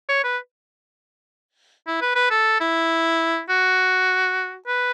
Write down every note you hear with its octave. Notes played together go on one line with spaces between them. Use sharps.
C#5
B4
E4
B4
B4
A4
E4
F#4
B4